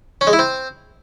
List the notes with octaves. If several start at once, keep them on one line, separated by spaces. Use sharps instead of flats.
C#4
G#3
E4
C4